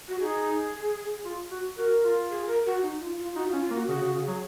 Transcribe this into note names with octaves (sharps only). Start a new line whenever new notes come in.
F#4
D#4 G#4
F4
F#4
F#4 A#4
F4
G#4
A#4
F#4
D#4
F4
F4
D#4 F#4
F4
C#4
F4
A#3
F#4
C#3 F#4
C#3
F#4
C#3
F#3 G#4